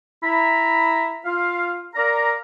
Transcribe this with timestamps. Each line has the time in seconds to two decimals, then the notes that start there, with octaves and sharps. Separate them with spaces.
0.23 E4 A#5 B5
1.26 F4 F5
1.95 A#4 D5 F5 A#5